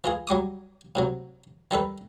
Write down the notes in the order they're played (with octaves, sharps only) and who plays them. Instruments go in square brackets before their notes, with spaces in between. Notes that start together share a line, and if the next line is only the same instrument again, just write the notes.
[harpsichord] E3 F4 G#4
F#3 G3 D6 D#6
A2 C3 F#3
D#3 G3 A4 B4